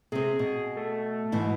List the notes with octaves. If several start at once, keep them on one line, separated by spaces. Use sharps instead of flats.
C3 C4 G#4
B2
A3
G#2 B2 E3